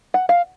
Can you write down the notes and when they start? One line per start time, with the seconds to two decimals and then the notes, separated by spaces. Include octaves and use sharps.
0.14 F#5
0.29 F5